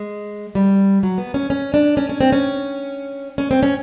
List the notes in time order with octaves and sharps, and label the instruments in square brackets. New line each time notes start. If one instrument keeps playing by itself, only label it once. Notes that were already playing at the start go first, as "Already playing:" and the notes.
Already playing: [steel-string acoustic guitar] G#3
G3
F#3
B3
C#4
C#4
D4
C#4
C#4
C4
C#4
C#4
C4
C#4